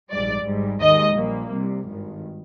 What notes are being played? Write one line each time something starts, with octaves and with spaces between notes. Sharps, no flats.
A#1 G#2 G3 D5
G#1 G#2 G3
D#2 D#3 G#3 D#5
A#1 A#2 G3 A#3
C2 C3 G3
G#1 G2 D#3